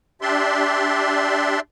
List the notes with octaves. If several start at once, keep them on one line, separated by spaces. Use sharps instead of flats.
D4 G4 D5 E5 C6